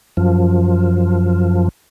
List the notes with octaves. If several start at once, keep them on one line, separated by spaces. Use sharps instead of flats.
F#2 F3